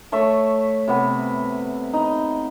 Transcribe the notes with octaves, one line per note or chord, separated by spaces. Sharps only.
A3 C#5 E5
C3 B3 B4
D#4